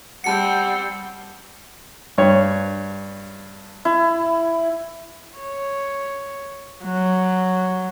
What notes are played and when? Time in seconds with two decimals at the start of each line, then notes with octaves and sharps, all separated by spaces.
0.24 G3 C4 F#5 A5 C#7
2.18 G2 C#5
3.85 E4
5.38 C#5
6.85 F#3